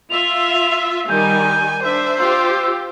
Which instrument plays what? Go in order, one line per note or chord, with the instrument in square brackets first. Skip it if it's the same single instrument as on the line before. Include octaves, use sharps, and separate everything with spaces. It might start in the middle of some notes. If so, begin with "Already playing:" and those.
[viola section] F4 E5 [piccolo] F7
[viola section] D#3 G3 [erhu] G#5 [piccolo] G6
[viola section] D4 E5 [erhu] C5
[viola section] F4 G4 [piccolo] E6